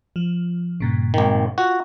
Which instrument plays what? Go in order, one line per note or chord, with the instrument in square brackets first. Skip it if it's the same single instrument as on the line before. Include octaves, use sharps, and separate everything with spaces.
[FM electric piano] F3
G2 A#2 C#3
[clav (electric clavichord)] G#1 D#3
[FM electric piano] F4 [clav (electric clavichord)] F#4